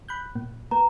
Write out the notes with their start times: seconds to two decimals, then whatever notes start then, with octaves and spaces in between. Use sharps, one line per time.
0.08 B5 F#6 G6
0.35 A#2 A#3
0.71 A#3 B4 A#5